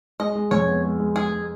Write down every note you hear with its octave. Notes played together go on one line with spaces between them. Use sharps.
G#3 D#5
G#3
F2 C#5
B3
G#3
G#3
G#3 G#4
G#3